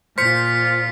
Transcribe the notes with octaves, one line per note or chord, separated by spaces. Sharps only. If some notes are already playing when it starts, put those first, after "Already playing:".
A#2 F4 C5 F6 B6 C#7